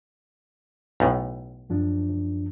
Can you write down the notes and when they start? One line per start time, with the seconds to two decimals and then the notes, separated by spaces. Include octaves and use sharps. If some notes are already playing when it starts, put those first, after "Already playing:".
1.00 B1 A2
1.70 F#2 F3 D4